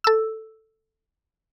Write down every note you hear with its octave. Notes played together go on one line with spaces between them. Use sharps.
A4 E6